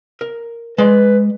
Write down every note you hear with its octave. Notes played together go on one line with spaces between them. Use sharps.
A#4
G#3 B4 D5 C6